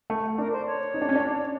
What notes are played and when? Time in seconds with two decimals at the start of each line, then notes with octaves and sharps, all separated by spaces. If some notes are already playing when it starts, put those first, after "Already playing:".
0.10 A3
0.38 D4 A#4
0.52 C5
0.66 C#5
0.94 D#4
1.02 D4
1.09 C#4
1.16 D4